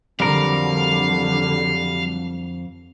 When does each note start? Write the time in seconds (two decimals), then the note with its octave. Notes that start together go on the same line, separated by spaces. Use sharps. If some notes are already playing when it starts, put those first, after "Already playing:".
0.20 F2 D3 F#3 G3 A#4 F5